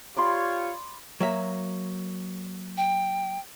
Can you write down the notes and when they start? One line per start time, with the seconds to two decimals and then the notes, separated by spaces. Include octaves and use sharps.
0.17 F4 G4 C#5 D5 B5 C6
1.20 F#3 A#3 E5
2.77 G5